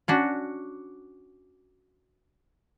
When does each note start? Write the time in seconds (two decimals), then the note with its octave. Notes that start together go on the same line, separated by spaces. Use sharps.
0.08 C#4 D4 F#4